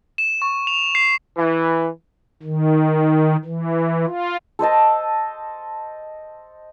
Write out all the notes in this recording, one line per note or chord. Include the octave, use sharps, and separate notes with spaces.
E7
C#6
F7
C7
E3
D#3
E3
F4
A4 C5 D#5 A5